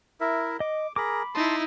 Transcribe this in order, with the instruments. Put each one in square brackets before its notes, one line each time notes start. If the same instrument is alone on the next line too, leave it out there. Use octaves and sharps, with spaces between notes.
[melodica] E4 A#4 E5
[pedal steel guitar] D#5 [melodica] D6
[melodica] G#4 A#4 A#5 [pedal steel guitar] B5 D6
[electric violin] D#4 E4 [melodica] A5 C6